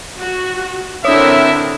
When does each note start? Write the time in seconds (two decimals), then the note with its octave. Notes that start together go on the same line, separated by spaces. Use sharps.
0.19 F#4
1.05 D3 C4 D4 E4 A#4 C#5 E5 D#6